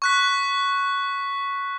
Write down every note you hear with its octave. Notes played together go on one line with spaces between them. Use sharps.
C#6 F#6 B6